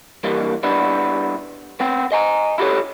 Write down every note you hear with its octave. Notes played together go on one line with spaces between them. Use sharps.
G2 E3 G3 A#3
G3 B3 D4 E4
B3 C4 G5
D#5 G#5 A#5
E4 F#4 G4 A4 C#5